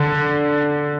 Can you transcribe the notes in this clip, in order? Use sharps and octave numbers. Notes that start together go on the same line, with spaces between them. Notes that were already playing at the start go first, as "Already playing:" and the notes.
Already playing: D3